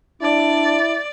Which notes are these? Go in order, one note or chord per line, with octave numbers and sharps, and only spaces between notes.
D4 E4 D5